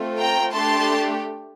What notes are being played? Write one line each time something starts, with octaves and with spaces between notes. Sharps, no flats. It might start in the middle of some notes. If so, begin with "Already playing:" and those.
Already playing: A3 C4 F4
G5 A#5
A3 D4 G4 A5 C6